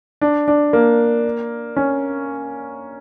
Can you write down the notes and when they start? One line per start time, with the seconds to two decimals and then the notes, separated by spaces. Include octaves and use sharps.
0.21 D4
0.48 D4
0.73 A#3
1.76 C#4